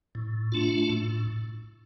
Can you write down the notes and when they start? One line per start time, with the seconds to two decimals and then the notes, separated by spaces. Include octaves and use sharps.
0.15 A2
0.52 A3 D4 F4
0.90 A2